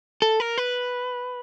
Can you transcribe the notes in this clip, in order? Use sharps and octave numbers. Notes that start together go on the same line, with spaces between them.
A4
A#4
B4